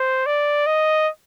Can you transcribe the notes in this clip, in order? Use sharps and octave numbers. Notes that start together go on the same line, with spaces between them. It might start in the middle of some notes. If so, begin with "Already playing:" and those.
Already playing: C5
D5
D#5